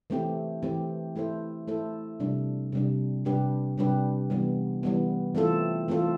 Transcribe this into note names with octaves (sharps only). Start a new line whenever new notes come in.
E3 A3 C4 G4
E3 A3 C4 G4
A3 E4 A4 C5
A3 E4 A4 C5
C3 G3 D4
C3 G3 D4
C3 G3 D4 G4 B4
C3 G3 D4 G4 B4
E3 G3 B3
E3 G3 B3
E3 A3 C4 F4 A4
E3 A3 C4 F4 A4